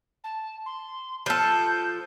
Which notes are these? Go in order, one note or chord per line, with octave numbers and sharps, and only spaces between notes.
A5
C6
F3 A4 G6